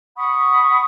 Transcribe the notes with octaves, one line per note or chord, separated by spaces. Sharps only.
F#5 B5 C#6 D#6